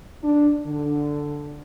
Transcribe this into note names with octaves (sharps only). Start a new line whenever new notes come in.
D4
D3